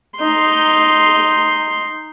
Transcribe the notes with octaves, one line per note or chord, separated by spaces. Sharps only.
D#4 C6